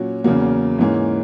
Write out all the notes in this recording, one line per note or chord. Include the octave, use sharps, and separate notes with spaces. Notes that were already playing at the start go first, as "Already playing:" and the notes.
Already playing: A#2 F#3 C#4 F#4
E2 C#3 F#3 A#3
G#2 E3 A#3 C#4